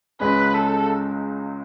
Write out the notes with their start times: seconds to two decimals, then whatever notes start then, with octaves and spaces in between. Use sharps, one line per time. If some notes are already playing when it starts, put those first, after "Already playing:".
0.20 C#2 C#3 G#3 C#4 B4
0.54 A4